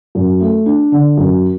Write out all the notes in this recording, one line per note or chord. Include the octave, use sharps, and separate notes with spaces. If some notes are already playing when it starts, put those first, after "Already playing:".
F#2
A3
D4
D3
F#2